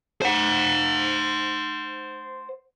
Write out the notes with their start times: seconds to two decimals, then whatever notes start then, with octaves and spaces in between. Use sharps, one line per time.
0.22 C5 F#5